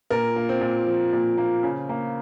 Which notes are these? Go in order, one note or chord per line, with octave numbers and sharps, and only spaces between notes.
A#2 A#4
A#3
C4
A#2
F3
A#2
A#3
C#3
A#3